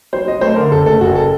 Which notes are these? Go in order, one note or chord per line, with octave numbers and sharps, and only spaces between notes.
F#3 C5
F#3 D#5
A3 C5
D3 A#4
F#1 A4
A3 A4
F#1 F#4
A4